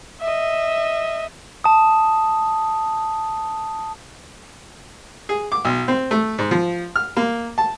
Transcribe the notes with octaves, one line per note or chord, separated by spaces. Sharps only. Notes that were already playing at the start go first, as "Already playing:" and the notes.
D#5 E5
A5 D#6
G#4
D6
B1
C4
A3
G#2
F3
F6
A#3
A5